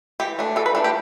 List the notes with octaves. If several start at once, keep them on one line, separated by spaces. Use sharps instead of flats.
E3 G4
A3 D4
E3 A4
B4
A3 D4 A4
G4